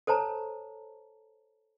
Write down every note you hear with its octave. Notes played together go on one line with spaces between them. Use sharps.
A4 C5 C#5 A5 A#5